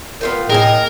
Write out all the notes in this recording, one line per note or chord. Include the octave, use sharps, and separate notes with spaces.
B3 F4 A#4 G5
A2 A#3 B3 G#4 A#4 D#5 G5